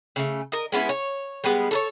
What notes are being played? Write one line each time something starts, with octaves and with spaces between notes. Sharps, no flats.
C#3 A3
A#4 D#5
G#3 B3 C#4 E4
C#5
G3 G#3 B3
A4 A#4 C#5